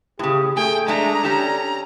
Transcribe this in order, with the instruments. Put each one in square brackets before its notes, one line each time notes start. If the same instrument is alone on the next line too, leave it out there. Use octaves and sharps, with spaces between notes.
[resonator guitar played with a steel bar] A2 C#3 [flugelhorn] G4
[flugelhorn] A3 [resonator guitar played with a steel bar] G#4 [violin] G5
[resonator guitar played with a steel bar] G#3 A3 [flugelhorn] D4 [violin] A#5
[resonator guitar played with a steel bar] C#4 G4 A4